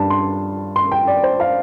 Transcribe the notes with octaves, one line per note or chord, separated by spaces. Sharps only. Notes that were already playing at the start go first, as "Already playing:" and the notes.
Already playing: G2 G3 D4 A5
C6
C6
G5
D5
C5
F5